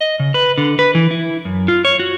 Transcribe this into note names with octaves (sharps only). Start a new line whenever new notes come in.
D#5
C#3
B4
D3
B4
E3
E4
F#2
F4
C#5
F#4